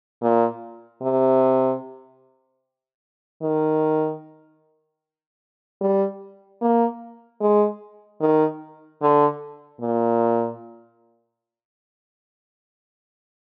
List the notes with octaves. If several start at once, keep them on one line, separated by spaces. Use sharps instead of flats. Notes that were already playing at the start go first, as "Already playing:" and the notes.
A#2
C3
D#3
G3
A#3
G#3
D#3
D3
A#2